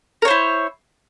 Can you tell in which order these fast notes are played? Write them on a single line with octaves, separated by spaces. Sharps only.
A#4 C#5 C5 E4